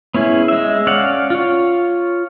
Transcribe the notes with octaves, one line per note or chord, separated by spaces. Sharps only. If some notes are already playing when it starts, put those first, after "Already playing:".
B3 C#4 E4 G#4
G#3 E5
C#4 D5 F5 F#5
F4 C#5